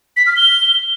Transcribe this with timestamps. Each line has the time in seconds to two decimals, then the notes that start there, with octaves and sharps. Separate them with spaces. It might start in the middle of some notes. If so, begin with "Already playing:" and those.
0.17 B6
0.27 F6
0.37 G7